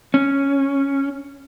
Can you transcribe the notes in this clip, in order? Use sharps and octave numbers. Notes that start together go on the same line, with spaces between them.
C#4